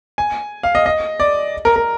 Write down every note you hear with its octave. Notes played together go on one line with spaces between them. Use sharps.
G#5
F5
D#5
D#5
D5
A#4
A#4